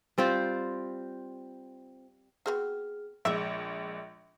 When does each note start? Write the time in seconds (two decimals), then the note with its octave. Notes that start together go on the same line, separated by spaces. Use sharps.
0.18 G3 C4 F4 C5
2.46 B3 C4 F#4 G#4 F6
3.25 A#1 G#3 E5 D6